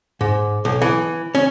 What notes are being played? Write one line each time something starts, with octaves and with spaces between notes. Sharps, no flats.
G#2
B1
E3
C#4